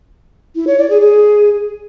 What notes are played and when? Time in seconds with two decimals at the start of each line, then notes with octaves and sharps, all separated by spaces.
0.56 E4
0.67 C#5
0.78 D5
0.90 G#4
1.01 G#4